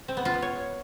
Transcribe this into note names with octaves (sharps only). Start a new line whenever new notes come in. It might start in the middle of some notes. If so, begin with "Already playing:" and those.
C4
B3
F4
B3
C#5